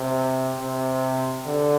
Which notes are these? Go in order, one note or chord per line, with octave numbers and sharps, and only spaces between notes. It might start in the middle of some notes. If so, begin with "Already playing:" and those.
Already playing: C3
C3
D3